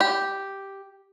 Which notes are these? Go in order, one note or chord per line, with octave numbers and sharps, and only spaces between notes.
G4